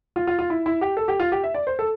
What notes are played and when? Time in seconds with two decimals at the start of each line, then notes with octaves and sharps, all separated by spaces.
0.16 F4
0.27 F4
0.39 F4
0.50 E4
0.66 E4
0.81 G4
0.97 A4
1.08 G4
1.20 F4
1.32 G4
1.44 E5
1.54 D5
1.67 C5
1.79 A4